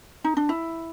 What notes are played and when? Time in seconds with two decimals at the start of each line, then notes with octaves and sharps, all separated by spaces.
0.24 D#4
0.37 D4
0.49 E4